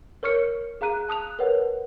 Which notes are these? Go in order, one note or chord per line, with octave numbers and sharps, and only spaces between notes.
A#4 C#5 C#6 F6 C#7
G#4 F5 A#5 F#6 D#7
A5 D#6 F#6 F7
A#4 B4 C#5 F#5